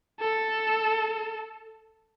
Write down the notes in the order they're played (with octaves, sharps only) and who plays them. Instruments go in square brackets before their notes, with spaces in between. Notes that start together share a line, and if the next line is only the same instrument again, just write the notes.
[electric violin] A4